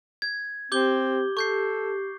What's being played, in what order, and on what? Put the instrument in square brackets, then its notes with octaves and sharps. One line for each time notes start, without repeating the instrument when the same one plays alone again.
[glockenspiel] G#6
[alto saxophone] C4 [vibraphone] G4 [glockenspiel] D6 G6 G7
[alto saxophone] A4 [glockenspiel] C#6 G6 C7